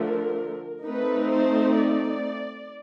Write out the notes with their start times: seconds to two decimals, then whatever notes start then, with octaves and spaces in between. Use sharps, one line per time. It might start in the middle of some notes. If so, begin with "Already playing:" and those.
Already playing: D3 F3 A3 A#4
0.87 A3 C4 D#4 B4
1.31 C5
1.77 D5